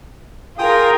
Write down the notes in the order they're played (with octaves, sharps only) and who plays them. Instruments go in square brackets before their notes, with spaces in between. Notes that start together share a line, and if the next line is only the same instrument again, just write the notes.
[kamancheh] F4 A#4 [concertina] G#4 G5 D#6